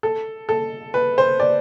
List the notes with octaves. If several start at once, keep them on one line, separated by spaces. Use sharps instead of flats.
A4
A4
B4
C5
D5